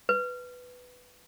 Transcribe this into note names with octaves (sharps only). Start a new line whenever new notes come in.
B4